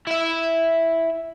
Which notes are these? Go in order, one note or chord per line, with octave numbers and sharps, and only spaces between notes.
E4 E5